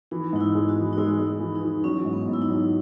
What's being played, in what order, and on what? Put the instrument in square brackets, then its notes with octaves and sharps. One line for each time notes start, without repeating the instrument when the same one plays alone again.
[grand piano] E3 [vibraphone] D#4
[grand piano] G#2 [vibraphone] D#4
[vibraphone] E4
[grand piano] G#3
[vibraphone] D#4 F#4
[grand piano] E3
[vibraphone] D#4
[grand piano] G#3 [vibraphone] E4
[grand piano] G#3
[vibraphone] D#4
[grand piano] E3
[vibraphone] D#4
[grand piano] E3
[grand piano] F#3 [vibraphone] C#4
[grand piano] G#2
[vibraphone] B3
[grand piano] G#2
[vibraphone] E4
D#4
[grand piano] F#3